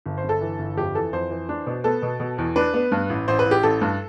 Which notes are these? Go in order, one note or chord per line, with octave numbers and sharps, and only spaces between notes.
G1
C5
G1
A4
E3
G1
F2 G4
E3 A4
F2 C5
E3
D4
B2
B3 A4
B2
B2
E2
D4 B4
B3
G2
A1
A1 C5
B4
A1
G4
A1 A4
G2